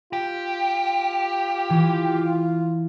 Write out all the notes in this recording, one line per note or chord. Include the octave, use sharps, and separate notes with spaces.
F4 G4
E3